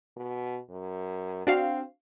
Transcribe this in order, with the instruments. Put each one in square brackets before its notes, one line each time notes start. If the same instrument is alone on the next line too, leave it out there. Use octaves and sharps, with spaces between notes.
[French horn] B2
F#2
[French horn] C4 [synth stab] D4 F#4 F5